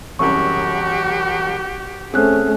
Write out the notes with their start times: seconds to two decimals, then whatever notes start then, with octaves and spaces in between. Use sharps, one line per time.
0.19 E1 C2 F#2 F#4 G4 C#6
2.14 A3 C4 C#4 G#4 C5 F6 F#6